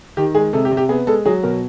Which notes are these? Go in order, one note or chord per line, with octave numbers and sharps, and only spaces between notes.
D#3 G4
G#3 G#4
C3 A4
G4
C3
G4
B3 G#4
G#3 A4
F#3 G#4
B2 A#4